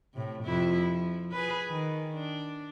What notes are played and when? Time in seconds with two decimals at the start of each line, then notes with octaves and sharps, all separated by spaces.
0.14 A2 C3
0.44 F2 C3 E4
0.83 F3
1.32 G#4 B4
1.69 D#3
2.14 D4